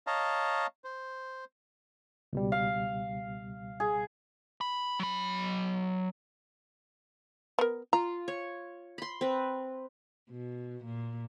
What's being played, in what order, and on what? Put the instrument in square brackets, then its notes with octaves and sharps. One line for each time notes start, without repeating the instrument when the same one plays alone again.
[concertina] C#5 D#5 F5 A5 A#5
C5
[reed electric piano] C#2 B2 G3
[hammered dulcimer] F5
G#4
[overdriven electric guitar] B5
F#3 B5
[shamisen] B3 A#4
[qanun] F4 [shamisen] A#5
[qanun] C#5
B5 C6
C4 B4
[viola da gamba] B2
A#2